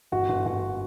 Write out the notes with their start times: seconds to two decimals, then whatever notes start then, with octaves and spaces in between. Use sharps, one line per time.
0.12 G1 F#4
0.29 G1
0.45 G1 F#4